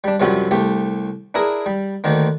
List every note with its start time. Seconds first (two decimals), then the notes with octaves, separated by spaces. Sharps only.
0.04 G3 D4
0.20 F#2 C3 F3 G3 F4 F#4
0.51 C2 A3 G4
1.34 D4 E4 G#4 A#4
1.66 G3
2.04 D2 D3 D#3 A#3